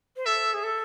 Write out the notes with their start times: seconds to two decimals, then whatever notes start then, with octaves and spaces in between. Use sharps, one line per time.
0.16 C5
0.26 A4 E5
0.54 G#4
0.63 A4